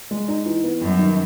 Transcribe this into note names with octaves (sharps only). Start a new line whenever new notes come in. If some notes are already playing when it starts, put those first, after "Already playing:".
G#3
D#4
E3
B3
F#2 G3
D#3